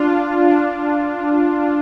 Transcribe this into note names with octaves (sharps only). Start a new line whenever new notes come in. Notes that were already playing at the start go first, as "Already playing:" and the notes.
Already playing: D4 F4
D4 F4